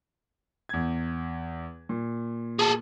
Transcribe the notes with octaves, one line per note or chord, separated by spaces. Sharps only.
E2 G#6
A#2
G#4 A4